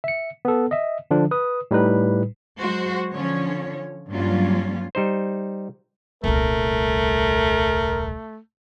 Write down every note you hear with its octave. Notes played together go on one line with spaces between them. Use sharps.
E5 C#7
B3 A4
D#5 E5
D3 F3 D4
B4 D#6
A2 G3 D#4 B4
F#3 G#3 F#4 C5
D3 F3 C#4 C#5
G2 F#3 G3 A#3 C#4 F4
G3 D#4 C5
D#1 C2 A3 A#4